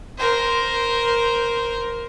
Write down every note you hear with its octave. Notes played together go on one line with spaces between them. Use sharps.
A#4 C5